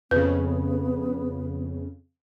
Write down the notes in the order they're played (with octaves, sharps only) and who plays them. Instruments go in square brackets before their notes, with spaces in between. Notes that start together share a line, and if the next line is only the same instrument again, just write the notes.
[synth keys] F2 C#3 [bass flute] B3 [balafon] B4